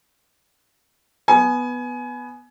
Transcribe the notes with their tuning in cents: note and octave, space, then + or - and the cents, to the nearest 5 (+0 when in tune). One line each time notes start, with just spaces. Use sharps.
B3 +0 G#5 +25